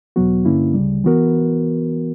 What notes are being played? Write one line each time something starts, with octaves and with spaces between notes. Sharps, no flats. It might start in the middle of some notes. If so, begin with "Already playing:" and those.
E2 B2 F#3 B3 F#4
G2 D3 A#3 C#4 E4
D2 C#3 G3
E3 B3 F#4 A#4